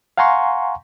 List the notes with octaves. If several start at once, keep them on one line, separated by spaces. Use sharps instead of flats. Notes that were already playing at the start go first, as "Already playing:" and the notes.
F5 F#5 G#5 A#5 C6 C#6